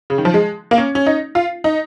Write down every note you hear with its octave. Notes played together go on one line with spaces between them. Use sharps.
C#3
D#3
F3
G#3
A#3
C#4
C#4
D#4
F4
D#4